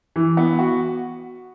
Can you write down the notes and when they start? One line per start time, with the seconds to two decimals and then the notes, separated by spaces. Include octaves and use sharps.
0.16 E3
0.37 B3
0.59 F#4